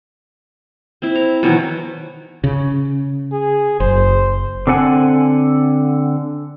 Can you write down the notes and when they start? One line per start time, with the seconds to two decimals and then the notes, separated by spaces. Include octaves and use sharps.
1.02 C4 E4
1.15 A#5
1.43 B2 D#3 E3 F#3
2.44 C#3
3.32 G#4
3.80 F#1 C5
4.67 D3 C4 A4 F#5 G#5